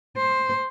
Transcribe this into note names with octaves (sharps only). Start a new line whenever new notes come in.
C5